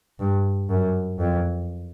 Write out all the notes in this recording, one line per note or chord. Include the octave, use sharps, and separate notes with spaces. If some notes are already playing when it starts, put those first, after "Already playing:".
G2
F#2
F2